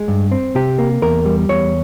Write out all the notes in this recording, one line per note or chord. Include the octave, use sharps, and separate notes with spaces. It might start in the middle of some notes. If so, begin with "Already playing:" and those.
Already playing: G#3
G2
C4
C3 G4
A#3
E2 A#4
G3
E2 C#5